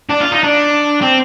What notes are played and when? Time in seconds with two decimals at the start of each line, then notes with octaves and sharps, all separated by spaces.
0.10 D4
0.20 F4
0.32 D#4
0.44 D4
1.01 C4